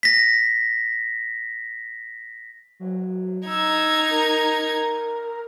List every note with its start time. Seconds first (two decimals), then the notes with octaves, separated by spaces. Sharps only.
0.03 A#6 B6
2.80 F#3
3.47 D#4 E6 G#6
4.10 A#4